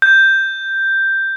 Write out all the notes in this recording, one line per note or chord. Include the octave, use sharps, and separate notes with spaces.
G6